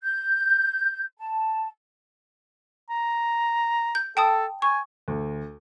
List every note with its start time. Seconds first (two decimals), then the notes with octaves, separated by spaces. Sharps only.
0.04 G6
1.18 A5
2.90 A#5
3.95 G6
4.17 A4 G5 A5 D#6
4.62 G#5 C#6
5.08 D2